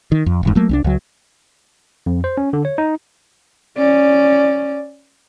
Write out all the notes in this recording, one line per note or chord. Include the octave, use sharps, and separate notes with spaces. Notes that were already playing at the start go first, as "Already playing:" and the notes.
D#3
F2
D#1 E2 G#2
F#3 A3 A#3
C2 C4 D4
C#2 F#3
F2
C5
C#4
D3
C#5
D#4
C#4 D5